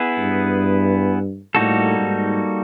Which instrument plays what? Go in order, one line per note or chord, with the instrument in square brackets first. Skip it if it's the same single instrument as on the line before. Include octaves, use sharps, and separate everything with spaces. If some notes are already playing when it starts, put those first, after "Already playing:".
Already playing: [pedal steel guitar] B3 E4 G#4 B4
[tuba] G2
[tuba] A2 [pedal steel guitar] G3 A#3 D#4 F#4 A4
[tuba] G#2